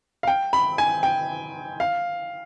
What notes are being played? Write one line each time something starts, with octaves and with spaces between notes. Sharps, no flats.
F5
G5
B5
G#5
G5
F5